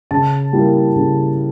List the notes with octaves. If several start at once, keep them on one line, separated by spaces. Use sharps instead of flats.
C#3 A5
G3 A#3 E4
C#3